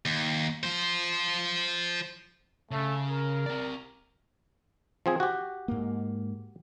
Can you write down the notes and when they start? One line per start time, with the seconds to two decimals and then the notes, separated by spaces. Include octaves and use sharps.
0.06 D#2
0.63 F4 C5
2.71 C#3 A3
3.09 A#4
3.46 C4 D5
5.06 F3 C4 G#4
5.20 F#4 G4
5.68 G#2 A#3